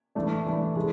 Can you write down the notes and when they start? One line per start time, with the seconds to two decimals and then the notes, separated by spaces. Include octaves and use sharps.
0.15 E3 A3 D4
0.46 E3 A3 D4
0.76 E3 G#3